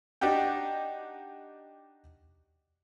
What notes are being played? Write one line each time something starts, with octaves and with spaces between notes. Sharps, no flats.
D4 D#4 F#4 G4 G5